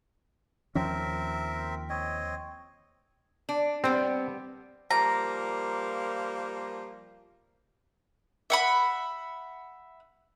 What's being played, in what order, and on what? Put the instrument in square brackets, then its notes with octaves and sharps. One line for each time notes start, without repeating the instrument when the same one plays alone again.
[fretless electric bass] D#2 F3 C#4 [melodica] C4 A#4 E5
[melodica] C4 C#5 D#5
[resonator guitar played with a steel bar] D4
[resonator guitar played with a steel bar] G3 B3 [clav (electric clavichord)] C4
[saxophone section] F3 G3 A#3 [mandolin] A#5
[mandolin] E5 F#5 B5